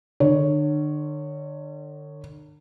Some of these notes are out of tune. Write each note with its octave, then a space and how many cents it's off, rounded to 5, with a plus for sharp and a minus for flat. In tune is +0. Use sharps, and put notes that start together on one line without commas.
D3 +40 C#5 +0